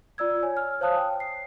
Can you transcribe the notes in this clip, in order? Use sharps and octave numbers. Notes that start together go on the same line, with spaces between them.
F4 D5 E6 G#6
C#5 G#5
F6
C5 C#5 F5 A5 D#6 F#6
G5
C7